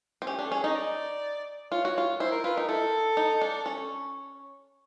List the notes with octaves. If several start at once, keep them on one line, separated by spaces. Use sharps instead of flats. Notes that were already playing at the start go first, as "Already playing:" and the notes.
C4
C#4 G4
D4
A4
C#4 G#4
D#4 D#5
D5
F4 C#5
F#4
F4
E4 C5
A#4
F4 B4
D#4 A#4
E4 A4
D#4
D4
C#4